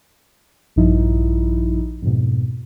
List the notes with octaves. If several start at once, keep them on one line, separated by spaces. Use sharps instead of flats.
A#1 G2 F3 D#4 E4
F2 G#2 B2